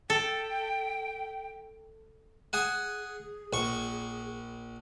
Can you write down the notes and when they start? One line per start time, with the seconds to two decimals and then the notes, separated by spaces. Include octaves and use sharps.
0.10 A4 G5
2.53 G#4 F#5 G#5 D#6
3.53 A#1 C#6